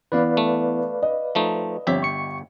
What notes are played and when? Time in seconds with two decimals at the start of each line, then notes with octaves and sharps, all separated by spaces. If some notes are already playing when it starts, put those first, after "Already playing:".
0.12 E3 B3 B4 D5 F5
0.37 A3
1.02 D#5
1.35 F3 A3 D#4
1.87 G1 F3 C4 G4 C#5 E5
2.03 C#6 C#7